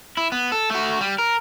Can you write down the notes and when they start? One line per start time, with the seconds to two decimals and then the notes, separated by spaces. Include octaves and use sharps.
0.17 E4
0.32 B3
0.52 A4
0.70 A3 F#4
1.01 G3
1.18 A#4